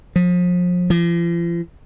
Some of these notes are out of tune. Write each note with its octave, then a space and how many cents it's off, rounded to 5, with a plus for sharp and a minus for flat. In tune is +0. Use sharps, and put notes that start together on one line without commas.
F3 +35
F3 -45